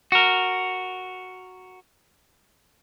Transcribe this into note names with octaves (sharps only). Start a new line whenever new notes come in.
F#4 A#4